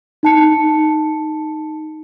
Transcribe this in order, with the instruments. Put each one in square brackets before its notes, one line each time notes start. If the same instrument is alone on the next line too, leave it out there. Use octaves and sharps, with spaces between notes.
[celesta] D#4 A5 C#7